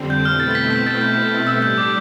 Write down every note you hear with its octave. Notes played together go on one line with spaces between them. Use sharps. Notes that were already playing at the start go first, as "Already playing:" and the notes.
Already playing: F2 D3 G3 C4
G6
B2 A3 C4 E4 F6
A6
A6
B6
B6
A6
G6
A2 G3 D4 E6
G6
D6